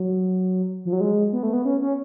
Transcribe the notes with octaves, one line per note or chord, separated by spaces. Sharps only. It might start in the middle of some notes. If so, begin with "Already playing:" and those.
Already playing: F#3
F3
F#3
G#3
B3
A3
B3
C#4
C#4